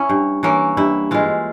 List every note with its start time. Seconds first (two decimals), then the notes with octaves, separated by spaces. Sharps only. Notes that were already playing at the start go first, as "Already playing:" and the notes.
Already playing: C#4 E4
0.09 G2
0.43 E3 A#3 C#4
0.77 G2 E4
1.11 E3 G#3 F4